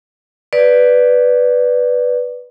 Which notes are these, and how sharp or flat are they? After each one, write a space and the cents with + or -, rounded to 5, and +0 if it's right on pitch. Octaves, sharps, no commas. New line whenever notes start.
B4 +0 D5 +0